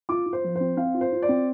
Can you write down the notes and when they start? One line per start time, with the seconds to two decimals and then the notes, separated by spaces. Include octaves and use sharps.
0.09 F4 D6
0.26 F4
0.33 C5
0.44 F3
0.55 C4 C5
0.77 C4 F5
0.94 F4
1.01 C5
1.12 F4
1.22 D5
1.29 C4